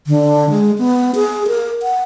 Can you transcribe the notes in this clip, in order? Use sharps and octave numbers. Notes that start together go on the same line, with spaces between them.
D3
G#3
B3
G#4
A#4
F#5